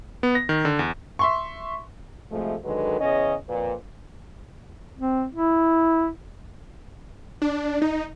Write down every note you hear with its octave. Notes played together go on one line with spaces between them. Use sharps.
B3
A#6
D#3
D3
E2
E5 C6 C#6
C3 F3 G#3 A3
D3 D#3 F#3 G#3 A4 B4
E2 C#3 C#4 D#5
F2 A#2 B4
C4
E4
D4
D#4